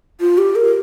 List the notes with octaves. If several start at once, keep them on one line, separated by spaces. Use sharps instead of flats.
F4
G4
A#4